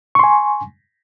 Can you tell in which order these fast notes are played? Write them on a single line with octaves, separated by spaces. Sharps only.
C#6 C6 G#5